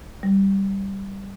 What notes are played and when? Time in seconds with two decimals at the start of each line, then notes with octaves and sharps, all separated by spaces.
0.23 G3